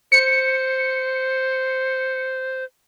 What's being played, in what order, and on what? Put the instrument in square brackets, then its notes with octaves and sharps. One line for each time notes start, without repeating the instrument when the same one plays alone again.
[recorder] C5 [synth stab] C#7